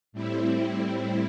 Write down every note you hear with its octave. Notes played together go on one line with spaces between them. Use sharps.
A2 G3 C4 E4